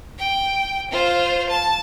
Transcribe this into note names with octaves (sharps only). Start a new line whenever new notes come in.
G5
F4 C5
A5